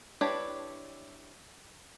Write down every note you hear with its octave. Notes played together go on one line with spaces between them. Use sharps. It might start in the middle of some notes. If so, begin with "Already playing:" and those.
D4 E4 G4 B4 C#5